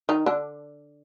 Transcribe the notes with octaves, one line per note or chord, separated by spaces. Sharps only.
D#3 D#4
D3 D4